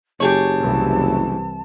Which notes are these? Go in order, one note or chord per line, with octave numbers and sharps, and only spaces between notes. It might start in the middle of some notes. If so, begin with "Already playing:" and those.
F#1 G4 G#4 C#5 A5
C2 E3